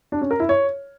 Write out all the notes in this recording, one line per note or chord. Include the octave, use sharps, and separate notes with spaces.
D4
C#4
A#4
E4
C#5